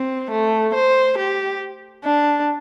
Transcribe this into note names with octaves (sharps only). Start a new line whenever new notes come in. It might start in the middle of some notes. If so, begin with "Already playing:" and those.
Already playing: C4
A3
C5
G4
D4